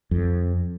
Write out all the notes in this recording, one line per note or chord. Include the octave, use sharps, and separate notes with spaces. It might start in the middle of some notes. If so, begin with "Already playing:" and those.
F2